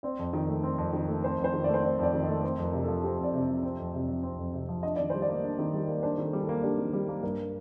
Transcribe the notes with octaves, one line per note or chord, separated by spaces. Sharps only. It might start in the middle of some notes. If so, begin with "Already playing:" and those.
C4 D5
F2
D#3
A3
C4
F2
D#3
A3
C4 C5
F2
C5
D#3
A3 D5
C5
C4 D5
F2 D5
D#3
D#5
A3
C4 C5
F2 A#4
C3
A4
F3
C4 G4
F2 D5
C3
F3
C4
F2
C3
F3
C4
F2
C3
F3
D4 D#5
D#3 D5
G3 C5
D5
A#3
D4
D#3
G3
A#3
D4 C5
D#3 A4
G3 G4
A4
A#3
D4 G4
D#3
G3
A#3
G2 A#4